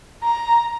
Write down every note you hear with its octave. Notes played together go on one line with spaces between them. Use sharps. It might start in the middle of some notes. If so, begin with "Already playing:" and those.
A#5